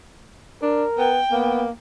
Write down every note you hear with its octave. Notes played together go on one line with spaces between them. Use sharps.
D4 A#4
B3 G5
A#3 B3